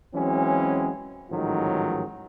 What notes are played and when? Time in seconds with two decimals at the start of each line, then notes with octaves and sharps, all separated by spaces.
0.14 E3 F#3 G#3 C4 C#4
1.30 A1 G#2 D#3 F3 F#3